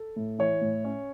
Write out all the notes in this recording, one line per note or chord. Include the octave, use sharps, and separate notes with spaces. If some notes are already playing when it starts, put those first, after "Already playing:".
Already playing: A4
A2
E3 C#5
A2
C#4